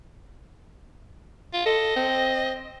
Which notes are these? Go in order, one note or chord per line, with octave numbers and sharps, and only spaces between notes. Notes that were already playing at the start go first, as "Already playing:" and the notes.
F4
A4 D#5
C4